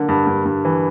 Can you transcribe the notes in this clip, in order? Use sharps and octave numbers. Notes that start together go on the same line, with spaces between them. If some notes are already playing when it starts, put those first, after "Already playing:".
Already playing: D3 A#3
G2
G2
G2
E3